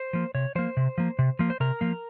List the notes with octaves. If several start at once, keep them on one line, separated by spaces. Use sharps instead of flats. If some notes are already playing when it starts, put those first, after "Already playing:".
Already playing: C5
F3 A#3
C3 C#5
F3 A#3 C5
C3
F3 A#3
C3
F3 A#3
C5
C3 A#4
F3 A#3